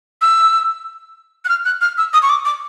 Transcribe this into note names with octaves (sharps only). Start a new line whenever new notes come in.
E6
F#6
F6
F#6
F6
E6
D#6
C#6
D6
D6